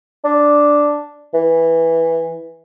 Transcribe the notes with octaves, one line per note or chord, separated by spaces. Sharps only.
D4
E3